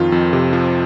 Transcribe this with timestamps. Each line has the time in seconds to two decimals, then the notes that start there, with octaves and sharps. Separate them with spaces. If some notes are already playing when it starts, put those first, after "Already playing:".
Already playing: F2 D#3 F4
0.12 F2
0.33 C3
0.53 F3